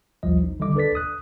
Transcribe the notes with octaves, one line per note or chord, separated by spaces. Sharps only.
A1 D#2 F3 G3 D#5
D#4
D3 D#3 G3 D#5 D6
D4 A4 B4 D5 A6 B6
D#6 F#6